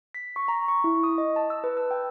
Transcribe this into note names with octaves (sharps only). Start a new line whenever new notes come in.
B6
C#6
A#5
C#6
E4
D#6
D#5
A5
E6
B4
E6
G5